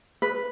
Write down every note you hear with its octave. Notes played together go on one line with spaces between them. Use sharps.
B4